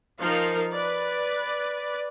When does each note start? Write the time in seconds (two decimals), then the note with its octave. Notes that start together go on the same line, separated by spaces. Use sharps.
0.20 F3 D#4 A#4 F5
0.73 B4 D5